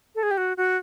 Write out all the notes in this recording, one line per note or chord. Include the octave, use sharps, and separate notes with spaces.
A4
G#4
G4
F#4
F#4